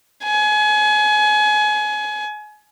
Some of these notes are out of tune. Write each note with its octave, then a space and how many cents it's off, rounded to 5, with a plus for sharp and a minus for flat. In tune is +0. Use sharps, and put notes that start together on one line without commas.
G#5 +30